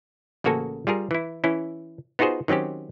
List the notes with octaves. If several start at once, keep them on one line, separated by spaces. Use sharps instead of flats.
A1 C#3 A#3 F#4 A4 G#5
G3 F4 G#4 A#4
E3 E4
E3 C#4 E4
B3 D#4 F4 F#4 G#4 C5
D#3 F#3 C4 C#4 G4